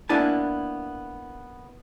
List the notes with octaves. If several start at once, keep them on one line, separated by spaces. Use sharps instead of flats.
A#3 B3 D4 E4 G#5 A5